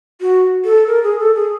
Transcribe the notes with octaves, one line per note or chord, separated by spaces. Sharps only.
F#4
A4
A#4
G#4
A4
G#4